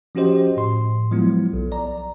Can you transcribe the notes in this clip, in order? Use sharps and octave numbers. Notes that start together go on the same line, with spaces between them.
F3 C#4 F#4 G4 C5 D#5
A2 C6
F3 F#3 G#3 B3 E4
B1
D5 A#5